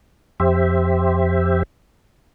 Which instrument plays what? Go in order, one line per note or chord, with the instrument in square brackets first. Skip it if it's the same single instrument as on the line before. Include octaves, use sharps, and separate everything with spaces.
[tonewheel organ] F2 G4 C5 E5